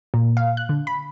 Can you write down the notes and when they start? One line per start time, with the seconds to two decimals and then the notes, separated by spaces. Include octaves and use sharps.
0.14 A#2
0.37 F5
0.57 F#6
0.69 D3
0.87 B5